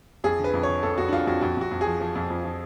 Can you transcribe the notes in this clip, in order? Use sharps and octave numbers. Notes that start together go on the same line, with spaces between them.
F2 G#4
D3
B4
F2
D3 C#5
F2 A4
F2 F#4
D4
F2 F4
F2 F#4
F2 F#4
F2 F#4
F2
G#4
F3
F3
F2
F2
F3